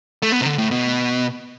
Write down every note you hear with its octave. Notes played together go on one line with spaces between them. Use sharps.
A3
B3
C3
D3
A2
B2